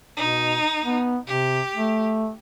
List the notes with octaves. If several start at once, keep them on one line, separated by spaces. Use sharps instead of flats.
B2 D#4
B3
C3 G4
A3